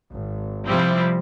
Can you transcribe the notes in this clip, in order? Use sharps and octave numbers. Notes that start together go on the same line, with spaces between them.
G#1
C3 F3 G3 C4 E4